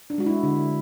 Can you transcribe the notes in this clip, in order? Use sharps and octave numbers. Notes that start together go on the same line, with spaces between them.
D4
G#3 F#4
E4
D3